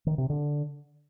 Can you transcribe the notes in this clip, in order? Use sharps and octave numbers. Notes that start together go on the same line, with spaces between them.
D#3
C3
D3